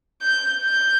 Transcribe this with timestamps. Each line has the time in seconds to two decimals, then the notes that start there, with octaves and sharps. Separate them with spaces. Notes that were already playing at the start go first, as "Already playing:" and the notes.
0.22 G6
0.62 G6